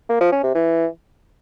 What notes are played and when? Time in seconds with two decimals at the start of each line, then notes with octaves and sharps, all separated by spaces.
0.09 A#3
0.21 F3
0.32 C#4
0.43 C3
0.55 E3